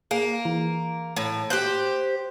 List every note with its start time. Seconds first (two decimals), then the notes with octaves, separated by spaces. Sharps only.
0.11 A#3 G#4
0.45 E3
1.17 A2
1.50 G4 C5 G5 F#6 G6